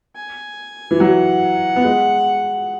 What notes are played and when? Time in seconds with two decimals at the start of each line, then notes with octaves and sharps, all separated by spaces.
0.16 G#5
0.91 E3
1.00 F#3 F#5
1.76 B3
1.84 G#3